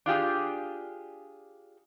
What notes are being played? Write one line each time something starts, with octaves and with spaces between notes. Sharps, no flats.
D4 F4 G4 G#4